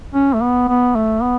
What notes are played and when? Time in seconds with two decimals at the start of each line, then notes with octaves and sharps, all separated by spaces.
0.14 C#4
0.34 A3
0.42 B3
0.68 B3
0.96 A3
1.23 B3